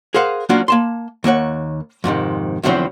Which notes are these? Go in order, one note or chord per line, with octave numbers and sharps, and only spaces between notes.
G#4 A#4 C5 F5 F#5
F#3 A#3 C#4 D4 F4 F#4
A#3 A5 C6
D#2 A#3 C#5 F#5
F2 G#2 C3 D#3
E2 D3 F3 F#3 C4 E4